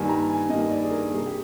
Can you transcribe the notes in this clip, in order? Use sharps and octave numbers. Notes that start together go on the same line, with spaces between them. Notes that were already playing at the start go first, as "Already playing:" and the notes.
Already playing: G2 D#3 G3 A#3 G#5
A#5
G#5
G2 D#3 G3 A#3 D#5
D5
G#4
A#4
C3 G3 A#3 G#4
G4